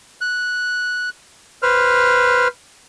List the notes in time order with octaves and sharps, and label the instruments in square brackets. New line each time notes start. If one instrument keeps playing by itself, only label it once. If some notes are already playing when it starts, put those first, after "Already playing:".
[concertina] F#6
B4 C5 F6